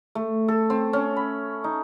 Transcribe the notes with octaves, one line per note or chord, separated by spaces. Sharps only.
A3
A4
C4
C#4
B5
D#4